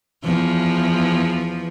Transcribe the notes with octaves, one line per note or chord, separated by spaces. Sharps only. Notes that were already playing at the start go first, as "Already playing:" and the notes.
E2 F3